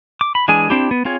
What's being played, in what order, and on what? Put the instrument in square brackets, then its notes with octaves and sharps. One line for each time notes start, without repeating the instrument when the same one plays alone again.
[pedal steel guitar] D6
B5
E3 G#3 D4 G#4 G#5
C4 D4 E4 G4
B3
C4 F4 G#4 C#5